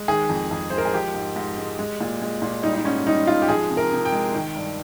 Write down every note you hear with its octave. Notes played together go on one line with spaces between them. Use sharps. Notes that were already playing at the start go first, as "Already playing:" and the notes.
Already playing: G#3
D#3 G#4
F2
F2
G#3 C5
A#4
G#4
F3 G4
G#2
G#2
G#3
G#3
A#2
G#3
A#2
G3 D#4
D#4
G#2 C#4
G3 D#4
G#2 F4
G4
F3 G#4
C3
A#4
C3
G5
G#3
D#3
G2